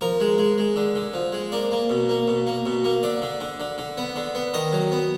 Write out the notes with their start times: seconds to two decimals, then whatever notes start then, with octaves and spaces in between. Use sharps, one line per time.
0.01 F3 A#4
0.20 G#3
0.38 G#3
0.58 G#3
0.76 D3
0.95 D3
1.14 F3
1.32 G#3
1.52 A#3 D5
1.71 A#3
1.90 B2
2.09 A#3
2.28 B2
2.47 A#3
2.66 B2
2.84 A#3
3.03 D3 D5
3.22 D3
3.40 D3
3.60 D3
3.78 D3
3.97 B3
4.16 D3
4.35 B3
4.54 D#3 D#5
4.73 F#3
4.92 B3